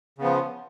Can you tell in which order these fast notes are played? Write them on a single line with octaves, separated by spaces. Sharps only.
C#3 B3 F3